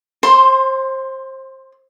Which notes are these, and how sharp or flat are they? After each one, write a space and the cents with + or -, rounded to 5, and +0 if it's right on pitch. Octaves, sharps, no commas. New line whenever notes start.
C5 +25 C6 +0